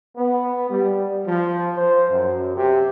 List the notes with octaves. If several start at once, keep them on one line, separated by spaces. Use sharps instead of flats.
B3
G3
F3
C5
F#2
C3